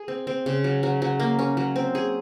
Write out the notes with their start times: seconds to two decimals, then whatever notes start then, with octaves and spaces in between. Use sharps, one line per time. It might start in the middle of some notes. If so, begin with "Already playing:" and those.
Already playing: G#4
0.08 C4
0.27 C4
0.46 C#3
0.64 F#3
0.83 F#3
1.02 F#3
1.20 A#3
1.39 C#4
1.57 F#3
1.76 C4
1.95 G#4